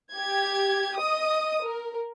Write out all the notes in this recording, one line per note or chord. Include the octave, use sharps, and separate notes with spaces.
G4 G#6
D#5 D#6
A#4